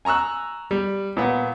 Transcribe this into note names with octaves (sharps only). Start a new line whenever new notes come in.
G#5 A#5 C#6 E6 F#6
G3
A#2 B3